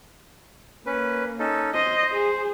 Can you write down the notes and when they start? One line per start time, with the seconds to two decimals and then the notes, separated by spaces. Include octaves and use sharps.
0.86 A#3 C#4 B4
1.39 C#4 D#4 A4
1.75 C5 D#5
2.14 G#4